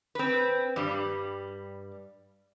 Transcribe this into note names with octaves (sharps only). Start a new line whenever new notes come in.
C4 B4
G2 G3